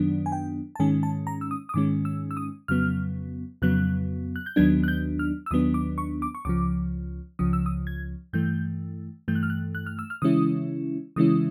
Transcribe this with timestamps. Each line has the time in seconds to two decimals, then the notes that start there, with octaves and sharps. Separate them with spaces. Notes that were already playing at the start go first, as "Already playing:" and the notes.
Already playing: F#2 D#3 F#3 B3 D4
0.26 G#5
0.32 G5
0.76 A5
0.79 G#2 D#3 G#3 C#4 G#5
1.03 A5
1.27 A#5
1.41 E6
1.51 D#6
1.69 D#6
1.74 G#2 D#3 G#3 C#4 D6
2.05 E6
2.31 E6
2.37 D#6
2.68 F2 C#3 F#3 B3 F6
3.62 F2 C#3 F#3 B3 F#6
4.36 F#6
4.46 G6
4.56 D#2 D#3 F#3 B3 D4 G#6
4.84 F#6
4.88 G6
5.19 F6
5.46 E6
5.51 D#2 D#3 F#3 B3 D4 D#6
5.74 D6
5.98 C#6
6.22 D6
6.35 C#6
6.45 C#2 C#3 F3 D6
7.39 C#2 C#3 F3 D#6
7.53 E6
7.66 D#6
7.87 G#6
8.33 G2 E3 A3 G6
9.28 G2 E3 A3 G6
9.35 F#6
9.43 F6
9.50 F#6
9.75 F#6
9.86 F6
9.99 E6
10.10 F6
10.22 C#3 E3 G#3 C#4 E4 D#6
11.16 C#3 E3 G#3 C#4 E4 D#6